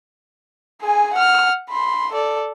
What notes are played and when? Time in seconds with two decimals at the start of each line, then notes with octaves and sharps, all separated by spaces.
0.82 G#4 G#5
1.13 F#5 F6
1.69 B5 C6
2.12 A4 D5